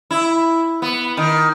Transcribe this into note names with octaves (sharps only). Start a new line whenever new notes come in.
E4
B3
D#3